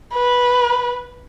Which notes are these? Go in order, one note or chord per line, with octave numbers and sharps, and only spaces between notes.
B4